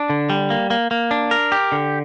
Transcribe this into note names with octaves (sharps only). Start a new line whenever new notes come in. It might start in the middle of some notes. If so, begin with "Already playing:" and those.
Already playing: D4
D3
G3
A#3
A#3
A#3
D4
A#4
G4
D3